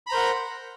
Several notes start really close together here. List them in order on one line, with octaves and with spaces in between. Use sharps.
B5 A#5 C5 A#4 F#5